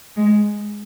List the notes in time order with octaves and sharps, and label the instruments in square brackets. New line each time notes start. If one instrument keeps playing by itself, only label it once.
[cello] G#3